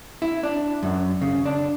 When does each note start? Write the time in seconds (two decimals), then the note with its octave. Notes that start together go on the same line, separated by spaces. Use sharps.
0.22 E4
0.43 D4
0.83 F#2
1.21 C#3
1.46 D4